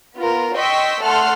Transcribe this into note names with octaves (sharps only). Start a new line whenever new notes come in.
B3 F4 A#4
D#5 G5 C6 C#6 E6 B6
A3 A4 F#5 A5 C6 F6